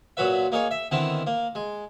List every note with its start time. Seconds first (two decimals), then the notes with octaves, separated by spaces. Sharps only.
0.17 A#2 F#3 F#4 B4 E5
0.52 A#3 D#4 G#4 C#5
0.71 E5
0.91 D3 D#3 B3 C4 E4
1.27 A#3
1.55 G#3